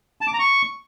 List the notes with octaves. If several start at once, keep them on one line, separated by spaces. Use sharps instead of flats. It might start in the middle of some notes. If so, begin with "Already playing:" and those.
A5
D6
A#5
C#6